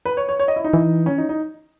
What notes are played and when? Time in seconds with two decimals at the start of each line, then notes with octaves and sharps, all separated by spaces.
0.05 B4
0.17 C#5
0.29 C#5
0.40 C#5
0.48 D#5
0.56 E4
0.64 D#4
0.73 E3
1.06 C#4
1.18 D#4
1.29 D#4